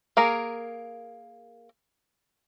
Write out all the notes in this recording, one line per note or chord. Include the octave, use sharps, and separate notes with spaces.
A#3 G#4 A#4